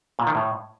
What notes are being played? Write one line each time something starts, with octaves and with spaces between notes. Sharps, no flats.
A#2
D#3
A2